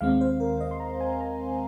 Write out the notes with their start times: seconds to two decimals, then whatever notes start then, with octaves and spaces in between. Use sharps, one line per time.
0.01 D#2 D#3 G#3 C4 F5
0.21 C5
0.40 A#4
0.61 D#5
0.71 C6
0.80 A#5
1.01 G#5
1.21 A#5